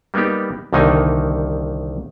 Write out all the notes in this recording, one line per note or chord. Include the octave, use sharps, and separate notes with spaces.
G3 A#3 B3 D#4 G4
C2 D3 D#3 A#3 D#4 G#5